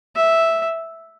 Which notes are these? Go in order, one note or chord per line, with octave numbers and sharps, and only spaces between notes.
E5